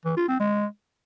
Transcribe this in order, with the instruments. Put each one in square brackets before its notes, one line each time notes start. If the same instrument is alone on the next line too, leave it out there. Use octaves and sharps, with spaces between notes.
[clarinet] E3
F4
C4
G#3